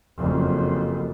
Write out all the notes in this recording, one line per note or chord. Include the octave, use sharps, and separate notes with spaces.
F#1 F2